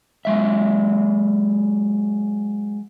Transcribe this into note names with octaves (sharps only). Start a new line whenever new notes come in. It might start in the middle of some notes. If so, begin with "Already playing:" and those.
F#3 G#3 E5